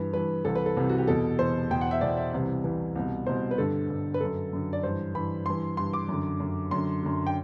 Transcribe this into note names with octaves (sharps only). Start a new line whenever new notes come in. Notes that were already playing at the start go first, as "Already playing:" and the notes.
Already playing: G2 E3 B4
G2 E3 B4
C2 C3 E3 A4
B4
A4
C2 C3 E3
F#4
G4
E2 B2 A4
E2 B2 C5
E2 B2 G5
F#5
E5
E2 B2 D5
E5
C2 C3 E3
C2 C3 E3
C2 B2
C2 B2 C5
B4
G2 D3 A4
G2 D3
B4
F#2 D3 A4
F#2 D3
D5
G2 E3 C5
G2 E3 B5
G2 E3 C6
G2 E3 C6
D6
F#2 D3
F#2 D3
F#2 D3 C6
F#2 D3
G5